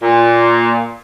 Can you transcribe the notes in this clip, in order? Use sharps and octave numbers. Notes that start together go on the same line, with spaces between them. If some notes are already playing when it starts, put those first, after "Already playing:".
A#2